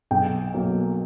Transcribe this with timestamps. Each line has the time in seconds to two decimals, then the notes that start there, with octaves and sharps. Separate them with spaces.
0.11 B1 G5
0.53 B2 F#3 A#3